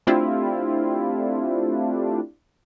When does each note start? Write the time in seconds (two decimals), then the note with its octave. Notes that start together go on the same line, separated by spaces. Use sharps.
0.07 A3 C4 D4 E4 F4 G4